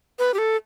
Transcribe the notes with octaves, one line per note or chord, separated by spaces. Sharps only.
B4
G4
A4